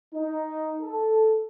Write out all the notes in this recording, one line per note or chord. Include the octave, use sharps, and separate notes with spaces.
D#4
A4